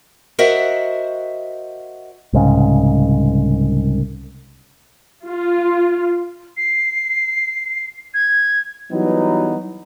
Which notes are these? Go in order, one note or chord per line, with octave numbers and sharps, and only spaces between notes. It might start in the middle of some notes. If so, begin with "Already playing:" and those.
F#4 A#4 C5 D#5 E5 F#5
C2 G#2 C#3
F4
C7
G#6
E3 F#3 G3 B3 D#4